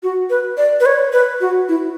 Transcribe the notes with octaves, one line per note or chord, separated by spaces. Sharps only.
F#4
B4
D5
B4
C#5
B4
F#4
E4